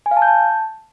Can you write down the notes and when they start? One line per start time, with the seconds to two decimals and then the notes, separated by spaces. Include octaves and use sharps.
0.06 G#5
0.11 F5
0.17 A5
0.22 G6
0.27 A5